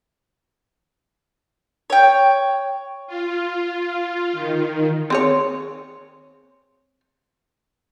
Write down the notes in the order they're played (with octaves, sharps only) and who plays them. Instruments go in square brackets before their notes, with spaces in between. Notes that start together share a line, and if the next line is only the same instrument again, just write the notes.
[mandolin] C#5 G5
[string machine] F4
D#3
[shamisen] C4 G#4 C#5